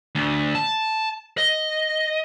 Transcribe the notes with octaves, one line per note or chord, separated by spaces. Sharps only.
D2
A5
D#5